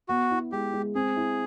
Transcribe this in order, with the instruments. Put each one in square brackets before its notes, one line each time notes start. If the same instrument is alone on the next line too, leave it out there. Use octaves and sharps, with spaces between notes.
[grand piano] B3 [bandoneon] F#4
[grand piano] E4
[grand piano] G#3 [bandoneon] G4
[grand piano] G#3
[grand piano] C4 [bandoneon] G#4
[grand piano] E4